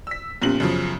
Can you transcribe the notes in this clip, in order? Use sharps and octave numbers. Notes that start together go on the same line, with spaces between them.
E6 B6
F1 A#2 B3 C#4 G4 F#7
F#2 C#3 F3